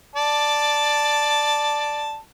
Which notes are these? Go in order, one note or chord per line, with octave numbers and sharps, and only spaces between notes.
D5 A5